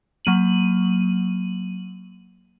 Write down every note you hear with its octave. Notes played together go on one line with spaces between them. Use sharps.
F#3 A#3 D#7 F#7